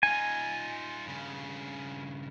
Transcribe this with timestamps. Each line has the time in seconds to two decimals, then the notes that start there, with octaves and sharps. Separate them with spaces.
0.03 D#4 F4 G#5
1.06 G2 C#3